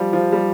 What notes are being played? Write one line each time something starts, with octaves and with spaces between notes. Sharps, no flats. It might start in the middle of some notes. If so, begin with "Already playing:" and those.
Already playing: F3 G3
F3
G3